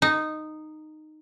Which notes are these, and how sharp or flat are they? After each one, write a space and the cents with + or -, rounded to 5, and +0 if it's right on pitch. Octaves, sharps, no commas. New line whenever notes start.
D#4 -10